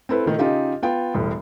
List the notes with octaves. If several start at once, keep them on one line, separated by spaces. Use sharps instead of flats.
C4 E4 A4 B4
A#2 D#3 A3
C#3 D#4 F4 G4
B3 F4 G5
E1 A2 G3